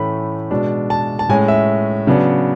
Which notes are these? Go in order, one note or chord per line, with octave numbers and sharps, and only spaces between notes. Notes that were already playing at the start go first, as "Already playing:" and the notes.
Already playing: A2 E3 A3 C#4 B5
B2 G#3 D4
A5
A5
A2 G#3 C#4 G#5
E5
C#3 F#3 B3 D4